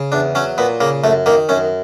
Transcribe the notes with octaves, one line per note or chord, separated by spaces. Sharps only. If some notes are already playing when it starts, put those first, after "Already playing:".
Already playing: C#3
E2 D4
F#3 C#4
A#2 B3
C#3 A#3
F#2 A3
D#3 A#3
F#2 C#4